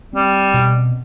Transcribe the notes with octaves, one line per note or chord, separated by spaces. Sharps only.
G3 C4
B2